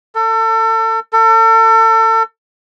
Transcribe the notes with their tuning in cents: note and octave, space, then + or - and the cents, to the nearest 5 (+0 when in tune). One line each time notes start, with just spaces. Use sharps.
A4 +30
A4 +35